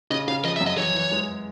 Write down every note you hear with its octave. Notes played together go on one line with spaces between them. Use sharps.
C#3 D#5
C#3 F5
F3 D#5
E5
F#2
D#5
E3 C#5
E3
G#3